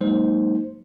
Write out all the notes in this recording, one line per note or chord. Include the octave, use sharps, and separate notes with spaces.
F#3 G#3 A#3 D#4 C5